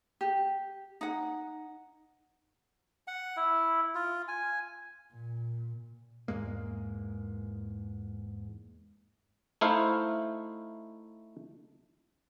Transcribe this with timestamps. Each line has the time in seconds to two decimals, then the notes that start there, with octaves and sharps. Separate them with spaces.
0.21 G4
1.01 D#4 F#5
3.08 F#5
3.37 E4
3.95 F4
4.28 G#5
5.13 A#2
6.28 E2 G#2 G#3 A#3
9.61 A3 D#4 E4 C5 F5